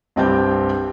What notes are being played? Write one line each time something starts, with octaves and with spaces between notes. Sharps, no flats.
C2 G2 C4 G4 G5 G6